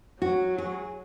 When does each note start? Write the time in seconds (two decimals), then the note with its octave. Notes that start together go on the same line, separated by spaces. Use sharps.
0.22 F#3 F#4
0.58 G#4